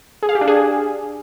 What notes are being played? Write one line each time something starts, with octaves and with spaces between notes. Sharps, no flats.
G#4
F5
G4
D4
G#4